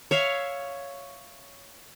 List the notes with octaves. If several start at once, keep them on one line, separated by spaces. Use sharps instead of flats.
C#5 E5 F5